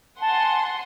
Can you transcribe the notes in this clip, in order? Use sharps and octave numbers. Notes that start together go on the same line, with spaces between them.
F#5 G#5 A5 C6